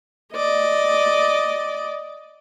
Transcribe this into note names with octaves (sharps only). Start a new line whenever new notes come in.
D5 D#5